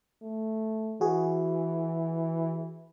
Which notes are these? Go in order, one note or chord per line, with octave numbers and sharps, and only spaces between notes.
A3
E3 F#4 G#4